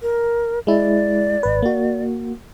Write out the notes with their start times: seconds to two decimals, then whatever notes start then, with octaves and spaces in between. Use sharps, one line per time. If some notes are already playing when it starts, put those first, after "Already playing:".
0.02 A#4
0.67 G#3 E4 D5
1.43 G#1 B4
1.62 A#3 F#4